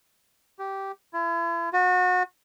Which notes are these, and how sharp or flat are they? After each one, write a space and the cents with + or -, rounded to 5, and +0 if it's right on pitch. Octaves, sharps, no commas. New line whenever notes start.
G4 -10
E4 +40
F#4 -30